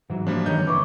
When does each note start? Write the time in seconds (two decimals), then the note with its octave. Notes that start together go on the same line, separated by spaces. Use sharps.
0.10 C2 G#2 E3 F#3
0.27 F3 G3 A#3 D4
0.46 G2 D#3 C#5 D#5 G6
0.67 F2 D3 E3 E4 C#6 D6